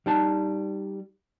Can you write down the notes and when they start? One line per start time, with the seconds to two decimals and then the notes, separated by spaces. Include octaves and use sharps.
0.06 G3 D#4 A5